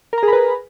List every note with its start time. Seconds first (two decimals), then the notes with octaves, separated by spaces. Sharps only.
0.13 A#4
0.18 A#5
0.23 G#4
0.28 B5
0.33 B4